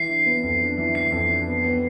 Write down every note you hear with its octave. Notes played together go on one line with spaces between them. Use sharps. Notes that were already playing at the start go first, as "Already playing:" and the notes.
Already playing: E3 C7
D4
B3
F2
D4
E3
E3 C7
F2
D4
B3
B3